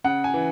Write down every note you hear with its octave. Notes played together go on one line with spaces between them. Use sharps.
C#3 F#5
G#5
E3